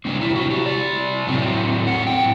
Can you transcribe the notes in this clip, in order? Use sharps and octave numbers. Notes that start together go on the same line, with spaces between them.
C3 G3 C4 D4
E4
F#4
G4
D5
A2 F#3 A3 C4
F#5
G5